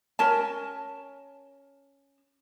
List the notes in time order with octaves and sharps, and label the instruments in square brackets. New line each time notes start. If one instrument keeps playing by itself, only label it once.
[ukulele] C#4 A#4 A5